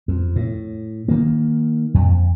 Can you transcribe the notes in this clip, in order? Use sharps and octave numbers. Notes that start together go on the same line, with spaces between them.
F2
A2
D#3 A#3
F2